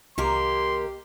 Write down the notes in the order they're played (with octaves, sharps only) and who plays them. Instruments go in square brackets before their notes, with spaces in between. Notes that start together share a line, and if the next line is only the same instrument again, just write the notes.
[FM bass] C2 [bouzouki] D#3 A#3 A#4 [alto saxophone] G4 [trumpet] C6